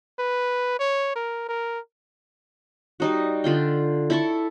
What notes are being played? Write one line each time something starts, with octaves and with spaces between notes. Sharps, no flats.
B4
C#5
A#4
A#4
G3 D#4 F#4
D3 F4 G5
E4 A4 C#6